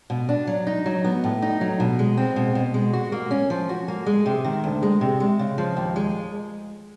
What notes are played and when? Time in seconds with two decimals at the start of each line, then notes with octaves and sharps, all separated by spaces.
0.10 B2
0.29 D4
0.47 F#3
0.67 D#4
0.86 F#3
1.04 B3
1.24 A2
1.42 D#4
1.61 F#3
1.80 B2
1.99 G#3
2.17 C4
2.36 B2
2.55 B2
2.74 G#3
2.93 F#4
3.12 A#3
3.31 C#4
3.50 F3
3.69 F#4
3.88 A#3
4.06 G#3
4.26 C3
4.45 D#3
4.64 D2
4.83 G#3
5.01 C3
5.20 G#3
5.39 C#3
5.58 F3
5.77 D#2
5.96 G#3